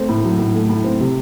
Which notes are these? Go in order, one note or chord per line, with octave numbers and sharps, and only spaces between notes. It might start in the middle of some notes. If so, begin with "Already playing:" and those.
Already playing: A3 C4
A2
F#3
A2
A3
A2
C4
C3